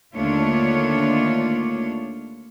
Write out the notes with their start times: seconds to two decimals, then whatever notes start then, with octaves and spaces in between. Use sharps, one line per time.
0.14 D#2 D3 A3 D4 F4 C#5